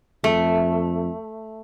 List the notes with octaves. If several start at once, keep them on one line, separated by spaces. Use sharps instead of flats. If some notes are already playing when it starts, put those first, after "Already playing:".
F2 A3